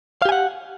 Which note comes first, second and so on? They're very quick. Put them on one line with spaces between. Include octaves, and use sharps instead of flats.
F5 G4 G#5 F#5